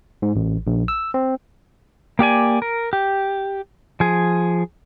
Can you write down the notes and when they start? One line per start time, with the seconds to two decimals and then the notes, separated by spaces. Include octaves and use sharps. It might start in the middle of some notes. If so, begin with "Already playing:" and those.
0.22 G#2
0.36 A1
0.67 A#1
0.88 E6
1.14 C4
2.19 A#3 G4 D5 G#5
2.62 A#4
2.93 G4
4.00 F3 G#4